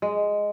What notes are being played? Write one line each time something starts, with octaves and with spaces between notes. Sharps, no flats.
G#3